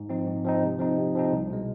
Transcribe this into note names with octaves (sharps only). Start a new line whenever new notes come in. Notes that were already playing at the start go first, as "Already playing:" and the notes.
Already playing: G#2
F3 C4 D#4
G#2
F3 C4 D#4
C3
F3 C4 D#4
C3
F3 C4 D#4
C2
B2 G#3